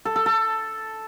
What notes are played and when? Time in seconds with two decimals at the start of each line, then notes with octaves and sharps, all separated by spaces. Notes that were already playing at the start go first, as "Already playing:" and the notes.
0.05 A4
0.16 A4
0.26 A4